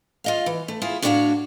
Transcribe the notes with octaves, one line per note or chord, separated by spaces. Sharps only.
F4 D#5 F5
E3
A3
E4 F4 G#4
A2 D4 E4 F#4 C#5 F5